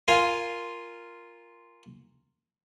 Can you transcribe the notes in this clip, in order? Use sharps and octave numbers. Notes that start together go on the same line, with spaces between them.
F4 A#4 F5 G#5 C6